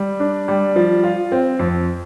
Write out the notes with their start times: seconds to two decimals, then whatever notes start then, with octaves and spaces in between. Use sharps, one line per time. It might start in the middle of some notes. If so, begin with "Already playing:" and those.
Already playing: G3
0.20 D4
0.48 G3
0.76 F3
1.04 F4
1.32 C4
1.59 F2